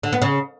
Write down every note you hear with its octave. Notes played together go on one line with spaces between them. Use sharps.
D3
B3
C#3